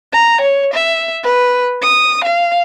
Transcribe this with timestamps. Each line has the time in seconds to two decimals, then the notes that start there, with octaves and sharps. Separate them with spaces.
0.12 A#5
0.41 C#5
0.74 E5
1.24 B4
1.82 D#6
2.24 F5